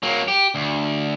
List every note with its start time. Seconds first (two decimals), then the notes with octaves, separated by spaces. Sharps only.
0.03 F#3 A#3
0.28 G4
0.55 D2